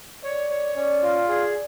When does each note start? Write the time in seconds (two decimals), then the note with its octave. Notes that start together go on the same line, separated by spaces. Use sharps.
0.24 C#5 D5
0.50 C#5
0.76 C#4 D5
1.03 F4
1.29 G#4 D5